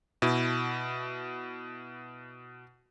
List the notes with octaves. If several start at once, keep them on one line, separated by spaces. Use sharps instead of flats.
B2 E4